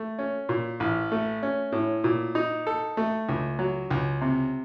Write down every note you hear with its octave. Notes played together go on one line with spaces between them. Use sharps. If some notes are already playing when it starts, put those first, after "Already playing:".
Already playing: A3
C#4
A#2
A1
A3
C#4
A2
A#2
D#4
A4
A3
C#2
F#3
C#2
C3